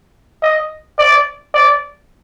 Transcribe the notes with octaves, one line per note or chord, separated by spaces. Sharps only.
D#5
D5
D5